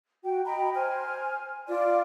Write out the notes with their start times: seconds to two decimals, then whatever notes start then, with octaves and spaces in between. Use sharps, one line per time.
0.23 F#4 G5
0.46 D#5 G5 A#5 B5
0.75 C5 G#5 F6
1.69 F4 D5